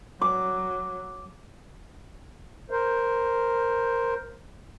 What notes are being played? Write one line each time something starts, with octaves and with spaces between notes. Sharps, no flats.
F#3 D6
A#4 C5